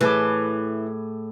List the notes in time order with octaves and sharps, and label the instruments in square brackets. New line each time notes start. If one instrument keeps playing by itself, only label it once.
[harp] A2 G#4 D6 [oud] E3